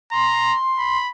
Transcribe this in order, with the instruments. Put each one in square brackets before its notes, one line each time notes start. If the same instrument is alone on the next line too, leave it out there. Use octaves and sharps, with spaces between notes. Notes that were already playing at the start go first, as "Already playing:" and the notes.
[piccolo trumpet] A#5 [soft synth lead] C6
[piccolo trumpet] B5